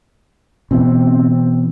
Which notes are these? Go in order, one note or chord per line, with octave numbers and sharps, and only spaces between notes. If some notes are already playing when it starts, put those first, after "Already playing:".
B2 E3 C4